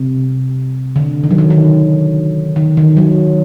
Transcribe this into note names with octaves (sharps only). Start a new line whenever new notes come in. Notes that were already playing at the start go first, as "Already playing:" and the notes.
Already playing: C3
D3
D#3
F#3
D#3
D#3
D#3
D#3
F#3